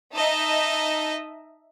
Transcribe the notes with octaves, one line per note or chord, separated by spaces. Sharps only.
D#4 D#5 E5 A5